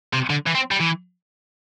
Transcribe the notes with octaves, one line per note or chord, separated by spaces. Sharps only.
C3
D3
E3
C4
G3
E3